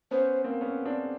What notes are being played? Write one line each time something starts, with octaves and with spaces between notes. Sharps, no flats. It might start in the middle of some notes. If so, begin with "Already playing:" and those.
B3 C#4 C5
A#3 C4
B3 C#4
C4 D4